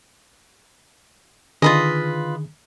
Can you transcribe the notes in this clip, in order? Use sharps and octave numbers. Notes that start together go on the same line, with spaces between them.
D3 D#3 F4 G#4 B4 D#5